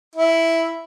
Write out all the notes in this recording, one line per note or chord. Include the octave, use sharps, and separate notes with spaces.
E4